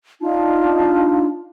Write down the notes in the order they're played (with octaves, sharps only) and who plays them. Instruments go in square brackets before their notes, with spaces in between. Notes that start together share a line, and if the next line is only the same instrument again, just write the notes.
[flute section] D4 D#4 F4 A5